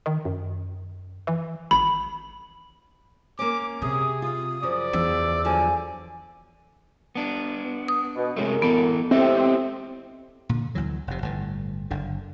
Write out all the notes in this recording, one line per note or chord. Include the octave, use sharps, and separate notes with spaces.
D#3
F#2
E3
G#1 B5
A#3 C#4 D6
C3 G#4 D#6
F4 F5 D#6
F#2 C#3 F3 D5
E2 E6
D3 F3 F#3 G#5
B3 D4
D#6
B2
F#2 C3 G#3 A3
E3 B3 A4
A2 C4 G4 A4 D#5 E5
A#2 D3
D2 E3 F#3
F1 C3
G1 A2
F#1 D3